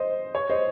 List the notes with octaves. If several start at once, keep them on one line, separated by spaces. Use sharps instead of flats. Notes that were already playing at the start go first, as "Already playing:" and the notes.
Already playing: C5 D#5
C#5
C5 D#5